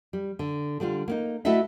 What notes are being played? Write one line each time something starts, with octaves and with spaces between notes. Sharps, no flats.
G3
D3
D3 G3 D4 F4
A#3 B3 D#4
A3 E4 F#4 A4 D#5 E5